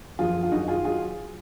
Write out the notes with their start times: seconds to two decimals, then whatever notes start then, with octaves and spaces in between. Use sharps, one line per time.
0.19 F#2 F3 F4 G#4
0.43 F4
0.52 F#2 D#3 F#3 D#4 F#4
0.68 F4 G#4
0.85 F#3 F4 G#4